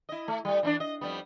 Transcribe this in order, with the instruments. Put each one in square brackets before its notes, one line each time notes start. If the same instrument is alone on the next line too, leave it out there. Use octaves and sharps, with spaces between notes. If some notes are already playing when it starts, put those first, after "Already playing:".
[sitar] E4 D#5
A3
G3 A3
E3 C4 D4
D#5
F2 G3 B3